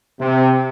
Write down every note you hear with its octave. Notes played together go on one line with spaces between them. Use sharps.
C3